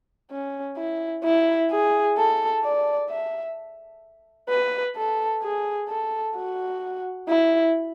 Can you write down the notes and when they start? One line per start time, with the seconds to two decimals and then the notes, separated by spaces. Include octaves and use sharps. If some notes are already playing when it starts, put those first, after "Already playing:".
0.31 C#4
0.77 E4
1.24 E4
1.71 G#4
2.17 A4
2.64 D5
3.10 E5
4.49 B4
4.96 A4
5.43 G#4
5.89 A4
6.36 F#4
7.29 E4